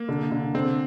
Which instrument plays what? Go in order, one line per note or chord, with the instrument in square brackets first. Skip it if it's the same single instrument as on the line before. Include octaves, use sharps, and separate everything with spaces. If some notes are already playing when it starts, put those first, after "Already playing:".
Already playing: [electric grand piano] A#3
[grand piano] D3
D3
[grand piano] D3 [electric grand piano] C4